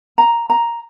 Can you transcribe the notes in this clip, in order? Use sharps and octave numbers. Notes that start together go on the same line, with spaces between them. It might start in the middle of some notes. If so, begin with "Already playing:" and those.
A#5
A#5